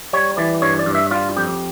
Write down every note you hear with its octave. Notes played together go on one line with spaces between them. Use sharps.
G3 C#5
E3 D5
G2 C#5
D5
G2
E5
G3 F4
F2 G4